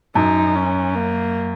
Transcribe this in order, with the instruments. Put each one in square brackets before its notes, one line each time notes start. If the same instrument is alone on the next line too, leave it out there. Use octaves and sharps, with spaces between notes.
[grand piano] F#2 [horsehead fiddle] D#4
[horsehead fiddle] C#4
A#3